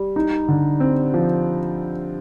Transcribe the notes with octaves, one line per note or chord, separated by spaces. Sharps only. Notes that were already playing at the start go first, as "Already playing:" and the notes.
Already playing: G3
D#4
D3
C4
F3